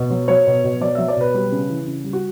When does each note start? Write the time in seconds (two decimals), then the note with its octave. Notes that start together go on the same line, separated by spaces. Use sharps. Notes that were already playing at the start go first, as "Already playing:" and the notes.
Already playing: B2
0.10 F#3
0.28 F#3 C#5
0.47 B2
0.64 B2
0.81 F#3 D5
0.95 F#3 E5
1.08 D5
1.16 B2 B4
1.34 G3
1.52 C#3
1.70 E3
1.87 C#3
2.04 G3
2.13 F#4